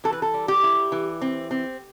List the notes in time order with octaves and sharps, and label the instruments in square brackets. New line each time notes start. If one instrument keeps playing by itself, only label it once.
[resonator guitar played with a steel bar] E3 A4
B4
A4
G3
G4
E4
E3
C4
C4